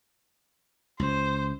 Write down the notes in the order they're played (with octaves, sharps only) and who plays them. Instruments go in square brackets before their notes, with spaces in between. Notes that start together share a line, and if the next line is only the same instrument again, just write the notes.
[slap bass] C#2 [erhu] C5